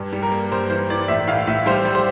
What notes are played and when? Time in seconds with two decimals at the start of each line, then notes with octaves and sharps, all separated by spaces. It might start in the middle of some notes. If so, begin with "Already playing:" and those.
Already playing: G2
0.13 G3
0.23 A#4
0.32 A#3
0.52 G2 C5
0.70 E3 C5
0.90 E3 D5
1.08 A2 E5
1.27 A2 F5
1.47 A2 E5
1.66 G3 C5
1.85 G3
1.95 C5